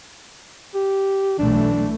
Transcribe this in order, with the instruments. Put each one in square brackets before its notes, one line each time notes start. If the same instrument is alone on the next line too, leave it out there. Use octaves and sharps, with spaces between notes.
[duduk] G4
[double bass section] B1 E3 A3 [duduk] D4